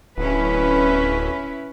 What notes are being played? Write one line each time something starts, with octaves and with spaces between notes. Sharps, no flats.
D1 C#4 E4 B4